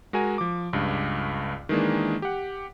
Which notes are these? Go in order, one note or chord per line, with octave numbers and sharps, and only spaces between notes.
G#3 F#4 A#4 G#5 A#5
F3 D6
C#2 G2
D#3 E3 G#3 A#3 D4
G4 F#5